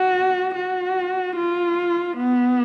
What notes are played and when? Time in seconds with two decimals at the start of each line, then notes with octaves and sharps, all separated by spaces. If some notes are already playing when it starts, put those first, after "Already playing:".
Already playing: F#4
0.55 F#4
1.36 F4
2.17 B3